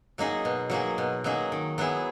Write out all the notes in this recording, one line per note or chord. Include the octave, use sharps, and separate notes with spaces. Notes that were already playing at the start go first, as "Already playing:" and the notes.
F#3 A#3 D#4 G#4
B2
F#3 A#3 D#4 G#4
B2
F#3 A#3 D#4 G#4
D#3
F#3 B3 E4 G#4